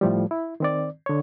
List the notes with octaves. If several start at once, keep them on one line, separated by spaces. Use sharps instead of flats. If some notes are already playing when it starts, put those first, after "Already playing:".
A2 F3 G3
E4
D#3 C4 D5
D3 C#5